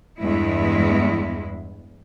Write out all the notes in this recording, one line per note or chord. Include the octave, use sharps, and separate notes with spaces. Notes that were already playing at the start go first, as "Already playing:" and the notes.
E2 G2 G#3 E4